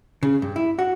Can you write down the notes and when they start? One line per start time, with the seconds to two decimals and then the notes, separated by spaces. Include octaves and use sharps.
0.23 C#3
0.42 G2
0.56 E4
0.79 F#4